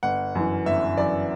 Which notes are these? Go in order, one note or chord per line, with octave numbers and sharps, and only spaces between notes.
G1 F#5
F#2 E3
G1 E5
F#2 E3 D5